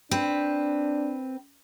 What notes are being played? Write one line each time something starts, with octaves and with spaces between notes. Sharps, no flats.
C4 D4 B4